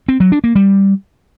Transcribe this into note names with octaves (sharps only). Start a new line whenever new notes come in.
C4
F#3
D4
A#3
G3